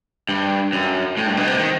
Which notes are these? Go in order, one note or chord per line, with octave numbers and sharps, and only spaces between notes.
G2
F#2
A2
G2
B2
C3
D#3